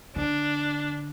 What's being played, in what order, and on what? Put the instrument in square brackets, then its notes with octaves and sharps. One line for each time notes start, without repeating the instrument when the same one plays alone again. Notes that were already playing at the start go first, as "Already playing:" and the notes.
[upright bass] D3 [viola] D4